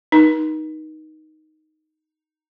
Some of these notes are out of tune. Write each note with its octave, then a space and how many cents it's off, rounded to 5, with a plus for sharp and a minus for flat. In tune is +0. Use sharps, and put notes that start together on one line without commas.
D#4 +0 A#4 +45 C6 -30